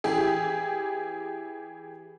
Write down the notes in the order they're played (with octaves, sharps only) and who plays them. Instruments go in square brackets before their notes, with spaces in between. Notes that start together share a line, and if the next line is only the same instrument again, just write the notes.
[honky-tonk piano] E3 E4 G4 G#4